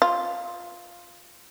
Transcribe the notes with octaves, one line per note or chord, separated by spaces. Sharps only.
F4